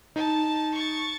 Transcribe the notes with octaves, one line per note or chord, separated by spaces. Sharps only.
D#4 A5
C#6 A6